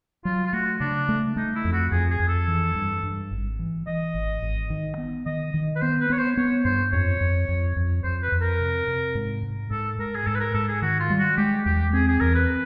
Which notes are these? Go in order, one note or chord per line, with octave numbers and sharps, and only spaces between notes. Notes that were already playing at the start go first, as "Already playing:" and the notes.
F#3 F4
F4
A3 F#4
C#3 D4
A3
A3 D#4
E4
F2
F#4
F2 G#4
G#4
F2
A4
E3
G2
G2
G#1
E3
E3 D#5
G#1
G#1
D#3
B3
D#3 D#5
D#3
B4
B3 C5
B4
B3 C#5
C5
B3 C#5
G2 C5
F2 C#5
F2
F2
F2
F2 C5
B4
F2
A#4
C3
C3
G#2
G#2
G#2 A4
G#2 A#4
G#4
G#2 A4
B4
A#4
G#2 A4
G#4
D#3 F#4
F4
G3
F#4
G#3 G4
E2 G4
C4 G#4
G#4
E2 A#4
B4